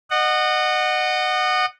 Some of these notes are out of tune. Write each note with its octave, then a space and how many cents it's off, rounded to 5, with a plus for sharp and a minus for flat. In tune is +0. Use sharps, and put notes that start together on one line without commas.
D#5 -30 F#5 +0